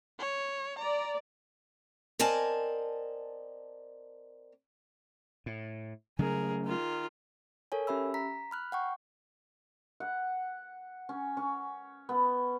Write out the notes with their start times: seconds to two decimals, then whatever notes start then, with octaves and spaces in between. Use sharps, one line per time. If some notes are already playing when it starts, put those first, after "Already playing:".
0.19 C#5
0.79 D5 A#5
2.19 C4 A#4 D5 D#5 G#5 A5
5.46 A2
6.19 C#3 F#3 A3 G#4 A#4
6.65 D#3 F4
7.72 A4 A#4 C#5 G#5
7.87 C#4 G4 E5 B5 E6
8.14 A#5 B6
8.51 B5 F6 F#6
8.72 F#5 G5 C#6
10.00 F#5
11.09 C#4
11.37 C#4
12.09 B3